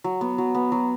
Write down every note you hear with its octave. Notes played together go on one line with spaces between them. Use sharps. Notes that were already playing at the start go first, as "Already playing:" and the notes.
F#3
B3
F#3
B3
F#3